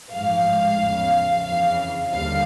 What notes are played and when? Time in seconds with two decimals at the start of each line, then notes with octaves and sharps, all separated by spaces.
0.12 A1 G#2 F3 F5
0.78 E2 C#3 F3
1.45 F2 C#3 E3 F5
2.12 D#2 D3 G3 F5